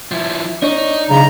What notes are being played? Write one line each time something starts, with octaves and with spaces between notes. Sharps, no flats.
F3 E4
D4 D#4 C#5
B1 C#3 D#4 A#5